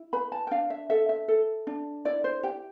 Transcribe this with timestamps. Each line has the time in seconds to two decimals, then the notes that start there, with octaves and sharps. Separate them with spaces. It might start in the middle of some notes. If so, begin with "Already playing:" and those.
Already playing: E4
0.13 B4 B5
0.32 A5
0.47 G5
0.51 D4 F5
0.70 E5
0.90 A4 E5
1.09 E5
1.28 A4
1.67 D4
2.05 E4 D5
2.24 C5
2.43 G4 G5